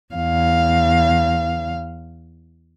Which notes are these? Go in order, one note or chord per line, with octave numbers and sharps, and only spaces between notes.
E2 F5